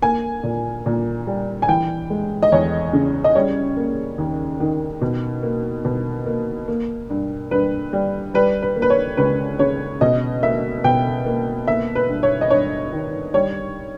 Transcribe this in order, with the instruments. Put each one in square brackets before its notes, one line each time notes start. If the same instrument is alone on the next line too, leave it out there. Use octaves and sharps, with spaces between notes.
[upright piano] A#3 G#5
A#2
A#2
G3
G#5
E3 G5
G#3
D#5
E2 C#5
C#3
D#5
G3 C#5
A#3
D#2
D#3
B2
A#3
B2
A#3
A#3
G2
G2 B4
G3
G3 B4
B4
A#3
B4
C#5
C#2 B4
C#3 C#5
B2 D#5
A#3 E5
B2 G5
A#3
A#3 E5
B4
G2
C#5
D#5
G2 C#5
D#3
G3 C#5